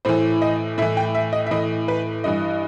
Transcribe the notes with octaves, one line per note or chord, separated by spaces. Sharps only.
A2 E3 C5
D#5
A2 E3 E5
G5
E5
D#5
E5
A2 E3 D#5
B4
G2 E3 D#5